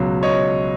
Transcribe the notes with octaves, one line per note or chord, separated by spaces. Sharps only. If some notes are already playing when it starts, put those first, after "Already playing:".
Already playing: C#2 B2 F#3
C#5 D#5